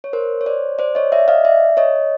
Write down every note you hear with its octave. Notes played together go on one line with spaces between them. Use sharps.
C#5
A#4 C5
C#5
C5 D5
C5 D5
C#5 D#5
D5 E5
D#5 F5
D5 E5
C#5 D#5